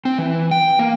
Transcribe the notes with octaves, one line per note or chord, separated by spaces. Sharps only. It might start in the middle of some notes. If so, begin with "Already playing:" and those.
C4
E3
G5
A#3